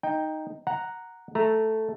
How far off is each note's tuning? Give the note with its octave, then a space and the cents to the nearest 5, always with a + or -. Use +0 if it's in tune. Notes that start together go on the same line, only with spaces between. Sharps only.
D#4 +0 G5 +10
F#5 +0 A#5 +0
A3 +0 A#5 -5